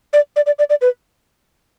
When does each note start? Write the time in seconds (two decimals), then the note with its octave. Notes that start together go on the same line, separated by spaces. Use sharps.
0.13 D5
0.36 D5
0.46 D5
0.59 D5
0.70 D5
0.82 B4